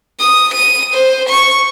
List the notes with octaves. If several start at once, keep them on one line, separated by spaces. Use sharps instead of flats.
D#6
D#7
C5
C#6